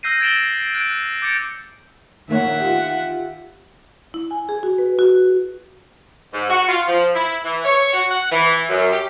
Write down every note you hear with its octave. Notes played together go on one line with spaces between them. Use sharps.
E6 F6 G6 A#6 C7 D#7
G#6 A6 D7 E7 F#7 G7
F#6 G#6 D7
D6 G6 A6 C#7 D7
A#1 D#3 A#3 C#5 E5 F#5
F4 G4
E4
G#5
G#4
F#4
B4
F#4
G#2
F#4
F4
F3
E4
E3
C#5
F#4
F#5
E3
F#2
G4